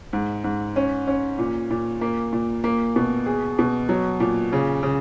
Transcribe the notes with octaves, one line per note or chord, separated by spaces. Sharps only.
G#2
G#2
C#4
C#4
A#2
A#2
A#3
A#2
A#3
B2
G#4
B2
F#3
A#2
C#3
C#3